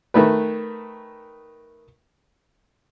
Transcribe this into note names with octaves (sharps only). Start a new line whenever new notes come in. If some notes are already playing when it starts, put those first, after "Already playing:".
D#3 A3 B4